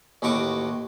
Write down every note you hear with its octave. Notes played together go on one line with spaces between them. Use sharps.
A1 D#2 F#4 D#5 C#6 D6